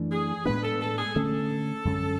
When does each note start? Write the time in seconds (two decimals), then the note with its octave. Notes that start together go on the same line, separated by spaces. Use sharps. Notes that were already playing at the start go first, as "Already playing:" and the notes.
Already playing: F#2 E3 A3 D4
0.11 G#4
0.46 A2 G#3 B3 D4 B4
0.63 A4
0.80 A4
0.98 G#4
1.15 D3 A3 C#4 A4
1.85 F#2 D3 G#3 C#4